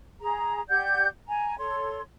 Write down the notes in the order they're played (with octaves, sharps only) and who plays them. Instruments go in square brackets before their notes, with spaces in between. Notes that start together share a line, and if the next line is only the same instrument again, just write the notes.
[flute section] G#4 A#5
G4 D5 F#5 G6
G#5 A#5
A4 C#5 C6